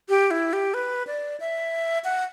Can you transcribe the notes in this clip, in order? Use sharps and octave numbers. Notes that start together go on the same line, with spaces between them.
G4
E4
G4
B4
D5
E5
F#5